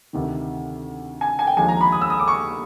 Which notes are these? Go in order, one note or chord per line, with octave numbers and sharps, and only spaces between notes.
D2 C3 D#3
G#5
G#5
G5
D#2 D3 F3 G#3 G#5
A#5
B5
D#6
E6
D#6
D6
C#6